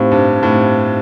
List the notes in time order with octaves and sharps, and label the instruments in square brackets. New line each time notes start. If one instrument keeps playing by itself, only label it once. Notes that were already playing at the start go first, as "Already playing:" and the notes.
Already playing: [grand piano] A2 [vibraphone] C4 D#4 G4 C5 F5
[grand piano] G2
A2